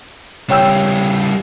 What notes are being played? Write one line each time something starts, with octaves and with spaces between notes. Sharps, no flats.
C#3 G3 C#5 G5 E6